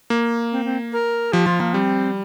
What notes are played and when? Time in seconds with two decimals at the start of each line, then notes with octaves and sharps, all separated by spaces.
0.10 A#3
0.52 C4
0.65 C4
0.93 A#4
1.32 F3 G4
1.46 F3 F4
1.60 F3 A#3
1.73 G3 C4